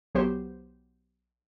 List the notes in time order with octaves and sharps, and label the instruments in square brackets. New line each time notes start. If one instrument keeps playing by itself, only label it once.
[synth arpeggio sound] B1 F#3 B3 G4 C5